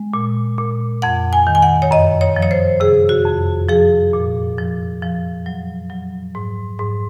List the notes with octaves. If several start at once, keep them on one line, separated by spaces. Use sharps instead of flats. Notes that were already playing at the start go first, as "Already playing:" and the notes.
Already playing: G#3
A#2
A#2
F2 F#5
G#5
D#3
G#5
F#5
C#5
F#2 D#5
C#5
F3
C#5
C5
C3 G#4
F#4
F2
F3 G#4
A#2
F3
F3
F#3
F#3
G#2
G#2